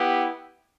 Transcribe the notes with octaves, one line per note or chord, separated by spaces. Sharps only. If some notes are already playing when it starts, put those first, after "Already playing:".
Already playing: B3 E4 G4